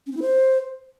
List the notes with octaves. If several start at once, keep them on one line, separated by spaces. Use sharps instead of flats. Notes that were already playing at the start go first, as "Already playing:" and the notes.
C#4
C4
E4
C5